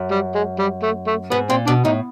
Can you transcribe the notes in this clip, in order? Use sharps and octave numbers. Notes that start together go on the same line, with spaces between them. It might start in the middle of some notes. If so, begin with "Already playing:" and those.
Already playing: F#2
G3
G#3
G3
A3
A3
G#2 B3
A#2 C4
B2 D4
A2 D#4